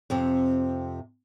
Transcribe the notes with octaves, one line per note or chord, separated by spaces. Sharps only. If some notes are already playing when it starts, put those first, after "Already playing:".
F2 C3 C4